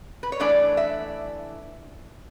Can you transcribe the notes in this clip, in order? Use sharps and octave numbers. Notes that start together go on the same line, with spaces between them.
B4
C#5
E3 A3 D4 D5
E5